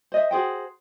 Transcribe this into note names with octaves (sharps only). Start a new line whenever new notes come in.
C5 D#5 E5
F#4 G#4 C5 G5